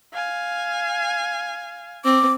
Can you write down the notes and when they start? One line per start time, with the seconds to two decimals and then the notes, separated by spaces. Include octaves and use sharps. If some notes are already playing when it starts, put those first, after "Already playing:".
0.14 F5 G#5
2.04 C4 D6